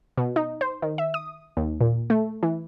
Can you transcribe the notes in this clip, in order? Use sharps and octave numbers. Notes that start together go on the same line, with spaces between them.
B2
D#4
C5
D#3
E5
D#6
D#2
A#2
A3
E3